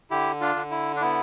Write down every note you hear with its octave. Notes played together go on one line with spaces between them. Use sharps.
D3 E4 G4
D4 F4
D3
E4
D4
B3 E4